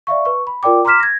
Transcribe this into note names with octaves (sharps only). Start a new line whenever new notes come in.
D5 E5 F5 C#6
B4 C#6
B5
F4 A#4 D5 G5 D6
A#5 C6 D6 F6 B6 E7
G#6 A#6